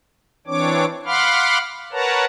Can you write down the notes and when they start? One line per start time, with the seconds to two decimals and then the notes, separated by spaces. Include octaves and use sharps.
0.47 E3 C4 D4 C#5 D6
1.06 F5 F#5 B5 C6 D6 F6
1.92 A#4 B4 C#5 F#5 A5 A#5